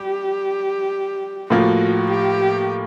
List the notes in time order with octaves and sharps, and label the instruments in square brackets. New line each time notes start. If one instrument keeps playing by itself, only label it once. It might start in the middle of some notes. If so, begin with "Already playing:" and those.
Already playing: [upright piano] G3 [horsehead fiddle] G4
[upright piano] A2 F3 A#3 [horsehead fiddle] F#4
[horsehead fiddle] G4